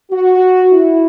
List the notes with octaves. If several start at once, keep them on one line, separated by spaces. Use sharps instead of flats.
F#4
E4